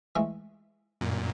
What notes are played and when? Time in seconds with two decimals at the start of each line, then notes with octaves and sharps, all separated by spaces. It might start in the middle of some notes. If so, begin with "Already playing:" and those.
0.16 E3 G#3 A3
1.01 F#2 A#2